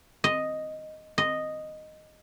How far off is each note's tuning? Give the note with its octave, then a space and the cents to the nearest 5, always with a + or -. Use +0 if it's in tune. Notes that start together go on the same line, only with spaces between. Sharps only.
D#5 +0
D#5 -5